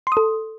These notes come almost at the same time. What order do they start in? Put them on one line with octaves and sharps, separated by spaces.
C6 D#6 A4